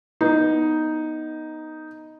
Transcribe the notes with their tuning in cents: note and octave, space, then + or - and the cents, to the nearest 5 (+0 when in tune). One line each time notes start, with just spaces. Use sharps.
B3 -15 D#4 +0